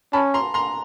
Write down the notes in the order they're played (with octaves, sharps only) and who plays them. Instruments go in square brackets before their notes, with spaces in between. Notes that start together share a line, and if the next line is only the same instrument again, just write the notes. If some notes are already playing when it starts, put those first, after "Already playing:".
[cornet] C#4 [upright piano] A5 B5
[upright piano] A#5 C6
A#5 C6